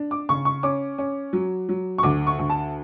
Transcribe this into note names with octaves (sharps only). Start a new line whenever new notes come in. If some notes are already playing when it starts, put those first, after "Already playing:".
Already playing: D4
D6
C#3 C#6
C#6
C#4 D6
C#4
F#3
F#3
C#6
D2 D6
C#6
D2
A5